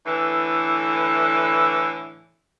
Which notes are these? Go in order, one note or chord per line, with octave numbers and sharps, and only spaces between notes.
A2 D3 E3